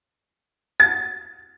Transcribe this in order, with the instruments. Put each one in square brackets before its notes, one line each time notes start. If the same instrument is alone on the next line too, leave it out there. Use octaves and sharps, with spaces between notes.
[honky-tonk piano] A6